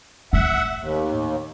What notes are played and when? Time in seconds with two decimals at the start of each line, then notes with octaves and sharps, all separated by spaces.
0.33 A2 E5 F#5
0.79 D#2